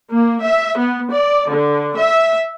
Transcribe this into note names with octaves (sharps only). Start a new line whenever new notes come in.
A#3
E5
B3
D5
D3
E5